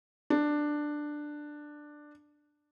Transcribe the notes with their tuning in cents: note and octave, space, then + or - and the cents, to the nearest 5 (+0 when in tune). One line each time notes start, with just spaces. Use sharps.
D4 +10